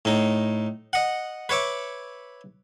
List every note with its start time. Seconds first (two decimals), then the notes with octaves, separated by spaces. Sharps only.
0.05 A2 D#4
0.93 D#5 F#5
1.49 B4 C#5 E5 D6